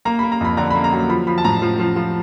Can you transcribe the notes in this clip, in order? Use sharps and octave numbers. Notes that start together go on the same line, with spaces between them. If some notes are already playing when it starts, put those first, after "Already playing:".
A#3 A#5
A#3 B5
A#5
F2 B5
D3 A#5
A#3 B5
A#5
F#3
F3 B5
F3 B5
A5
A2 A#5
F3
F3
F3